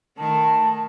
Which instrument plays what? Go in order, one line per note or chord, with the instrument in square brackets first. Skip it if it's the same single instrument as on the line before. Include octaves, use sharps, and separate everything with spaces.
[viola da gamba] D#3 A3 [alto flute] A5